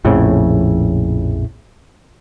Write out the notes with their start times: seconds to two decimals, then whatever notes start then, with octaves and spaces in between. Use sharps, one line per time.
0.05 A#1 F2 A2 C#3